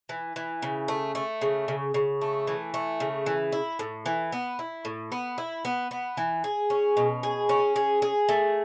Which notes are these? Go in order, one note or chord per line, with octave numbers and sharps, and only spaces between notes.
E3
E3
C#3
A3
A3
C#3
C#3
C#3
A3
E3
A3
C#3
E3
E4
A2
E3
B3
E4
A2
B3
E4
B3
B3
E3
G#4
C#4
B2
G#4
C#4
G#4
G#4
A3